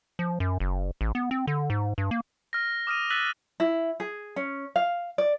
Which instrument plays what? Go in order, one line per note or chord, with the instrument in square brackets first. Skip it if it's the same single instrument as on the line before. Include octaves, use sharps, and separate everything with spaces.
[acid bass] F3
F#2
F#1
A1
B3
C4
D3
G#2
G2
A#3
[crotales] F6 A#6
D6 D#6 F6 A#6 D#7
E6 F#6 A6 B6 D#7 F#7
[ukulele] E4
G#4
C#4
F5
D5